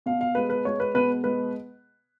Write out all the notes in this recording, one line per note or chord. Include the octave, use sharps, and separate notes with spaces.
B2 F5
F5
G#3 B4
B4
G#3 C#5
B4
B2 B4
G#3 B4